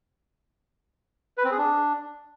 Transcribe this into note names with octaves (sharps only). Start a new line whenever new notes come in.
B4
C4
G#4
D4